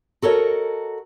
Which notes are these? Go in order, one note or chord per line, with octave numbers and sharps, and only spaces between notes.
F#4 A4 A#4 C#5 D#5